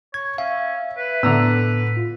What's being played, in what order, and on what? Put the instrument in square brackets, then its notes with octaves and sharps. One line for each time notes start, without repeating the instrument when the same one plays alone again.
[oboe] C#5 [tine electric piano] G#6
[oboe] C#4 [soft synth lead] E5 [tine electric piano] F5
[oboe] B4
[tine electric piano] A2 [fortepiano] D3 A#5 E6 [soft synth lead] B3
[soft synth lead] F4